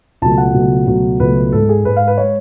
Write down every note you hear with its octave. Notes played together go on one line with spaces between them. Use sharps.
C#2 B2 F#3 A3 A5
F#5
C#2 B2 F#3 A3
C#2 B2 F#3 A3
C#2 B2 F#3 A3 B4
G#2 G#3 A4
G#4
G#2 G#3 B4
F5
B4
G#3 C#5